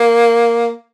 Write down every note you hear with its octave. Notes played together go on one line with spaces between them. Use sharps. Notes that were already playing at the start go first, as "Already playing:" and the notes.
Already playing: A#3